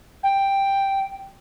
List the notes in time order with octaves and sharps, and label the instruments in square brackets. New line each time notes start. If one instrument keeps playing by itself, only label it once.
[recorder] G5